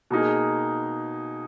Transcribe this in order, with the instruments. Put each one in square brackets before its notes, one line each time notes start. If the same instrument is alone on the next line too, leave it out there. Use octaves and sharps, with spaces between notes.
[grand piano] B2 A#3 D#4 G#4